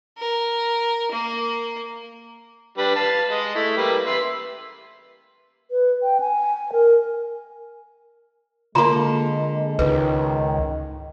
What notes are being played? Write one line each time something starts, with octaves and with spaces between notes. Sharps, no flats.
A#4
A#3
G3 D4 B4
B4 F5 A5
G#3 D#5
A3 E4
G3 A#3 B4
B4 E5 C6
B4
G5
G#5
A#4
D3 G#3 A#3 F4 A#5 C6
C#2 G#2 D#3 B4